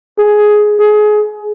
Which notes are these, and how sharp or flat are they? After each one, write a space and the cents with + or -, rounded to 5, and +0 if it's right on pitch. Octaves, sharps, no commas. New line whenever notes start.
G#4 +10
G#4 +25